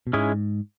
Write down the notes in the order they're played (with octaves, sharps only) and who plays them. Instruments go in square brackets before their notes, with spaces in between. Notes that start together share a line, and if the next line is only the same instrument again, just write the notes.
[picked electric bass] B2
[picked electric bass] G#2 [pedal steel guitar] G#3 C#4 E4 G#4